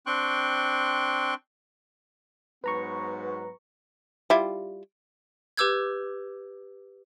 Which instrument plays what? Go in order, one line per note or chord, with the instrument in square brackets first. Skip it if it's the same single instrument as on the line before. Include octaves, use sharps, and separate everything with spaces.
[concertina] C4 D4 G5 C6 C#6 F#6
[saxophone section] G#2 F#3 B3 [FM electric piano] B4 A#5 C#6
[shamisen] G3 E4 F4
[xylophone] G4 B4 D6 E6 G6 G#6